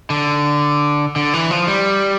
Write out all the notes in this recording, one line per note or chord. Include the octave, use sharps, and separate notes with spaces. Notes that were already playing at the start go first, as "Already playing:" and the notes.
D3
D3
E3
F3
G3